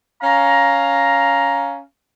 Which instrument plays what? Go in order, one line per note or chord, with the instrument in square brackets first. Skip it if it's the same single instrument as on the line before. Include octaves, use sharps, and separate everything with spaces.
[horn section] C#4 F5 A#5